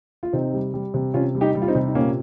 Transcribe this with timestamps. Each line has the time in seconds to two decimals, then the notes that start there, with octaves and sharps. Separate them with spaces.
0.23 F4
0.33 C3 C4 D#4
0.54 G3
0.74 G3
0.94 C3
1.14 C3 C#4 F4
1.35 G3
1.41 D#4 G4
1.55 G3
1.62 F4
1.68 C4 D#4
1.75 C3
1.88 D#4
1.95 A#2 A#3 C#4